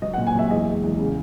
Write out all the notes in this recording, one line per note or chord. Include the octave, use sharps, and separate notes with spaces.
F#3 D#5
F#5
A#2
G#5
F#3 E5
E2 D#5
G#3
E2
C#3